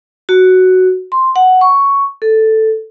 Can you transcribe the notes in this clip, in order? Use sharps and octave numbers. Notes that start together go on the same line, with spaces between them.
F#4
C6
F#5
C#6
A4